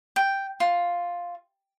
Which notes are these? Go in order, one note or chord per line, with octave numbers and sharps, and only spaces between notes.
G5
F4